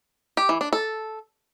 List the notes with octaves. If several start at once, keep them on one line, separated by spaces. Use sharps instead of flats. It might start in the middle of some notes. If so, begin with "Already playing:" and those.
G4
E3
D4
A4